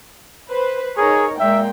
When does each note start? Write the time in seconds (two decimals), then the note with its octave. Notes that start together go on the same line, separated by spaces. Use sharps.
0.51 B4 C5
0.97 D#4 G#4 A#4 C#5
1.40 A#2 G#3 E5 G5